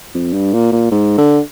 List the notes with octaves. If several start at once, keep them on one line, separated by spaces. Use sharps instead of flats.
F2
G2
A#2
A#2
G#2
D3